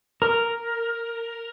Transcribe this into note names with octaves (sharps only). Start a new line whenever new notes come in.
A#4